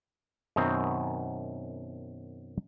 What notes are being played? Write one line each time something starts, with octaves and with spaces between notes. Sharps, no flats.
F#2 B2 D#3 C4 A#5